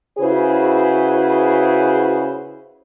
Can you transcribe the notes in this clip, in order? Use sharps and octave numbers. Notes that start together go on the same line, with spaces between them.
C#3 E4 F#4 G#4 B4 C5